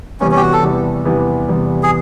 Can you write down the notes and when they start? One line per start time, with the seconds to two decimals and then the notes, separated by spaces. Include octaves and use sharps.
0.20 E2 C3 E3 G3 B3 C#4
0.31 C#4
0.37 G4
0.42 F#4
0.53 A4
0.63 E2 C3 E3 G3 B3
1.05 E2 C3 E3 G3 B3
1.48 E2 C3 E3 G3 B3
1.83 G#4